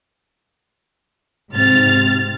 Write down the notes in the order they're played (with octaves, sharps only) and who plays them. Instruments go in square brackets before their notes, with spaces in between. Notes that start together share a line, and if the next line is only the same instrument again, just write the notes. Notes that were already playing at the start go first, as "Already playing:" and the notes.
[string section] G#2 C3 F6 A6